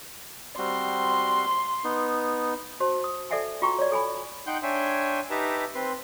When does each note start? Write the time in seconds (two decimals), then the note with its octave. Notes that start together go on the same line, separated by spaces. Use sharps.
0.58 G3 C4 F#4 C6
1.84 B3 D#4
2.80 F#4 C5 A5
3.04 D#6
3.30 A4 D5 E5 F#5 G#5 A5
3.62 F4 F#4 G5 A#5 C#6
3.78 C#5 D5
3.92 A4 G#5 B5
4.47 D#4 F#5 G5 C6 G6
4.63 D4 C#5 E5 G5 G#5 C6
5.30 D#4 G4 B4 E5 A5 A#5
5.75 C4 B4 C6